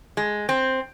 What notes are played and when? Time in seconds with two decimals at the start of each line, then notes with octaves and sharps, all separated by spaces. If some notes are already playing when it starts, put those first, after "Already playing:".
0.17 G#3
0.49 C4